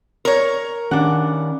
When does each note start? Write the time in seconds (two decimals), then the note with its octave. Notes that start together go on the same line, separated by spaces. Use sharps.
0.25 A#4 C#5
0.91 D#3 C#4 D4 F#5